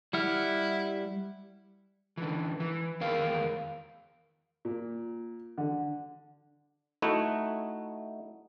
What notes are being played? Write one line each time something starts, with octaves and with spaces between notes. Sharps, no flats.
G3 E4 F#5 F6
D3 E3
E3
E2 D#3 A#4 F5
A#2
D3
A3 D#4 E4 F#4